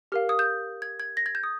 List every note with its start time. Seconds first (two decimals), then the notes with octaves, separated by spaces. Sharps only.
0.12 G4 A#4 F5 F6
0.29 D#6
0.39 G6
0.82 G#6
1.00 G#6
1.17 A#6
1.26 G#6
1.35 G6
1.44 D#6